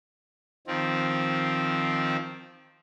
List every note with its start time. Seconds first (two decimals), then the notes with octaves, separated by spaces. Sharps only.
0.67 D#3 F3 C4